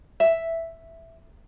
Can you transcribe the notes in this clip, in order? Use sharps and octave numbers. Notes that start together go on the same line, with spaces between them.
E5